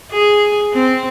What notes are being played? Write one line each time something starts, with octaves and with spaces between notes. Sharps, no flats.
G#4
C4